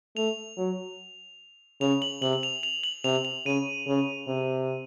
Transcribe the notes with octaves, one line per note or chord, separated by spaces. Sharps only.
A3 F7
F#3
C#3 F7
F#7
C3 F#7
F#7
F7
F7
F#7
C3 F7
F7
C#3 D#7
C#3
C3